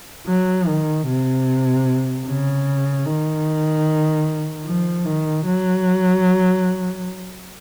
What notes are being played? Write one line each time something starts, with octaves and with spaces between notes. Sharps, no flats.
F#3
D#3
C3
C#3
D#3
F3
D#3
F#3